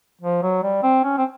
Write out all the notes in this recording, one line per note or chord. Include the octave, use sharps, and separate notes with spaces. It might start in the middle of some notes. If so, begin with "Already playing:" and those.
F3
F#3
G3
C4
C#4
C4